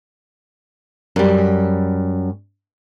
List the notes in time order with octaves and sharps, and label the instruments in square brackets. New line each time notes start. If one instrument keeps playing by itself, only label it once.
[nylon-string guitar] F#2 G3